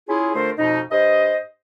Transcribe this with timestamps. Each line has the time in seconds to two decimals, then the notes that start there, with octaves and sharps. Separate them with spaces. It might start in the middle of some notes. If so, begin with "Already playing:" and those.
0.09 C#4 E4 F4 G#4
0.35 D3 A3 F4 A#4 C5
0.59 F2 B2 D#4
0.92 G2 C5 D#5